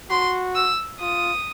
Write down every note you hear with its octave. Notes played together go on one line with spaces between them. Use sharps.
F#4 C6
E6
F4 D#6